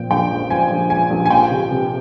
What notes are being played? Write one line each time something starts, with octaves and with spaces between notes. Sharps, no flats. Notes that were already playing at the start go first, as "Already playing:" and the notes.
Already playing: A#2 F3 G5
A#1 G5
F3
F3 G#5
A#1
F3 G#5
A#1
G#5
F3 G5
C3
C3